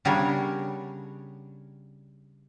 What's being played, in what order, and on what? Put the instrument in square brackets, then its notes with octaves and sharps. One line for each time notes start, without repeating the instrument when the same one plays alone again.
[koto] C#3 G3 B3 D4 A#4 C#5